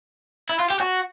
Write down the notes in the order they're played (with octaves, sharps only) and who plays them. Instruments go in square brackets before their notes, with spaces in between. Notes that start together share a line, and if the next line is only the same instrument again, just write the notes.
[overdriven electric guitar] E4
F4
G4
F#4